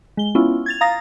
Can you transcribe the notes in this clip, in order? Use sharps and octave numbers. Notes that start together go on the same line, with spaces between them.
G#3 G7
B3 C#4 E4 F4
G#6 A6 F7
F5 A#5 D#6 A6 A#6